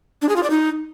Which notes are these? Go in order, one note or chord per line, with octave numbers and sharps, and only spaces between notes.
D4
G#4
F4
D5
D#4